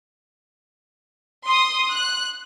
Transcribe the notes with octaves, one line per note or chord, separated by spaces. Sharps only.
C6 D#6
F#6